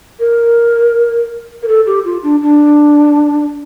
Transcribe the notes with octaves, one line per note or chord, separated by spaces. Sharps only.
A#4
A#4
A4
G4
F4
D4
D4